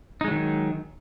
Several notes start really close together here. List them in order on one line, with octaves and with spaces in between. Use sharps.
D#4 G#3 F#3 D#3